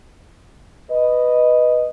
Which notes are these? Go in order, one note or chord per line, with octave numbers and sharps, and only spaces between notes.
B4 D#5